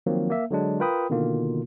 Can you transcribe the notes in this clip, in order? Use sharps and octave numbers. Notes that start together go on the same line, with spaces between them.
D#3 F3 F#3 A#3 C4
A#3 E5
D3 F#3 G#3 D4
F4 A#4 B4 G5 B5 D#6
B2 D3 D#3 A#3 F4